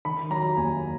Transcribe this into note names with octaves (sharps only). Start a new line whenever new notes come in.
D#3 B5
F#3 A#5
D#2 G#5